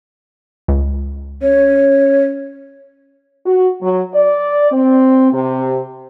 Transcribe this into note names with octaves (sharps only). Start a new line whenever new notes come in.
C#2
C#4 C#5
F#4
F#3
D5
C4
C3